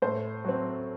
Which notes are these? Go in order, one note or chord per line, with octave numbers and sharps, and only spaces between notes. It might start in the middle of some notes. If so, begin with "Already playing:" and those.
A2 C5
F#3 C4